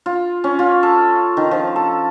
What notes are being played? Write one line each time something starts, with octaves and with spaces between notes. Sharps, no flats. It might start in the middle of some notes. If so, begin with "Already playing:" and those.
F4
C#4
F4
A4
D#3
F3
A4